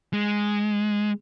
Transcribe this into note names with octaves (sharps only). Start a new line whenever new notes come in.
G#3